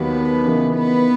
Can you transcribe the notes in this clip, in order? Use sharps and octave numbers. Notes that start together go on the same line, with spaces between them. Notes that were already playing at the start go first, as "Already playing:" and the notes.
Already playing: D#2 D#3 F#3 A#3 B3 B4
C#3 E3 A#3 D#4
B3 B4